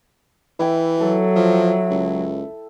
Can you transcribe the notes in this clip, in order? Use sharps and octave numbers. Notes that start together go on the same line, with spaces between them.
E3 E4 G5
F#3 A4
F3 E5
C#2